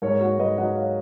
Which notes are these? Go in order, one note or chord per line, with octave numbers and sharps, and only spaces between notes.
G#2 A#4 C#5
A#3 F#4 A#4
G#2 B4 D#5
F#3 D#5 F#5
C#5 F5